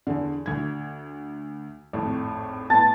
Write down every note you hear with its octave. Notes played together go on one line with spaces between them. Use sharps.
E2 D3
D2 G#6
G#1 F2 A2
A2 B3 A5